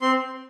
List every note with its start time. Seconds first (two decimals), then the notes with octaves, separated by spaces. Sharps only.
0.01 C4 C6